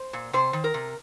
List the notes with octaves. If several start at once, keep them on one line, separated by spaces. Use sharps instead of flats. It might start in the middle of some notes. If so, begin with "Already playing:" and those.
Already playing: C5
A#2
C3 C5
D#3
A#4
C3